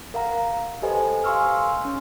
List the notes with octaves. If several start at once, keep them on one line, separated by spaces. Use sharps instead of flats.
A#4 F5 F#5 A#5
G4 A4 B4 C5 D#5 G#5
F5 G#5 C6 C#6 E6 F6
C#4